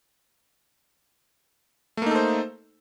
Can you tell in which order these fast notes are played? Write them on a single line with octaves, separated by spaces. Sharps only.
A3 A#3 D#4 A4 C5